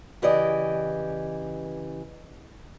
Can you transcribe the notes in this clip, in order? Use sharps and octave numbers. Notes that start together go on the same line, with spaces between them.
C#3 E3 G4 D5 D#5